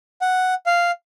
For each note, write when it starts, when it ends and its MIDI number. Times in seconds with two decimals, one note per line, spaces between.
0.21 0.54 78
0.66 0.91 77